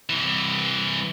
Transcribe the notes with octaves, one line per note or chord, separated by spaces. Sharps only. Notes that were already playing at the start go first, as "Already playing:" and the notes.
C2 E3